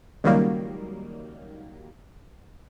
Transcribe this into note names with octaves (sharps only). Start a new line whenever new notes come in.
C#2 D#3 F#3 G3 A#3